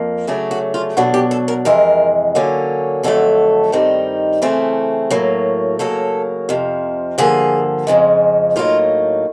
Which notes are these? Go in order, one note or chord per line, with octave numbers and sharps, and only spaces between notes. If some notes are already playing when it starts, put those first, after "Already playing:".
Already playing: F2 F3 A#3
C#3 F#3 A3 D4
F#4
F4
B2 F#3 B3 D4 F#4
G4
A4
A#4
F2 C3 E3 G#3 A#4
D3 F#3 A#3 C#4
F2 D3 F#3 A3 A4
G2 D#3 G3 C4 D#4
C#3 E3 A3 C4
A2 F#3 A#3
C#3 F#3 A#3 A4
F2 C3 F3
G2 D3 F3 A#3 G#4
F2 C#3 F3 G#3
A2 F#3 A#3 D#4 F4